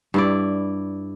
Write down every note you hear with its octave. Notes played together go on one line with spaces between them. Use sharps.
G2 E4 D5